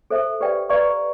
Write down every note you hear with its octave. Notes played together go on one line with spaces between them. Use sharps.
A4 C5 E5
G4 B4 D5 G5
B4 D5 F5 A#5 C#6